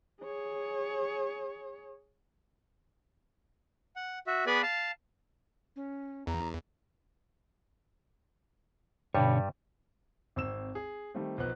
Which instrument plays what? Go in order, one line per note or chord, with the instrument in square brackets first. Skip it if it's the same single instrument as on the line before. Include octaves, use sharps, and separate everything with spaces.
[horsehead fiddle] G#4 C#5
[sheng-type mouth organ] F#5
F#4 E5
B3 G#4 B4 D5 G#5 B5
F5 A5
[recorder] C#4
[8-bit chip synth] E2 [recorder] A#5
[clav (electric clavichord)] G2 G3 [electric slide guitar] B2 D3 C#5
[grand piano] G#1 C4 E6 E7
G#4
D#3 G3 A3 C4
B1 F3 B3 C5 F#6